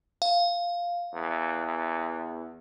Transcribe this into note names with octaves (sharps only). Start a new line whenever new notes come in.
F5
E2